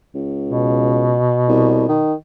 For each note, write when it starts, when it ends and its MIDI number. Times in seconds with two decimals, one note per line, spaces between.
0.14 1.20 37
0.49 2.04 47
1.48 1.86 36
1.89 2.14 51